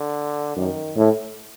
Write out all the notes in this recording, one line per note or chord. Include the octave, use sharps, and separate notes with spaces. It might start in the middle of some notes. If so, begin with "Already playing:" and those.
Already playing: D3
F#2 D#3
A2